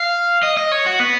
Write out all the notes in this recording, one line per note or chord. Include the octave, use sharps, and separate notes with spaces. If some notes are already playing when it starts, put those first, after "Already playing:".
Already playing: F5
D#5
D#5
C#5
F#4
B3